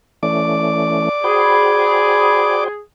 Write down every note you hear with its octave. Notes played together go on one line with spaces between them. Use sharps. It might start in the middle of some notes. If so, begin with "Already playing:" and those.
E3 A3 C#4 D5 D6
F#4 G#4 C5 G5 B5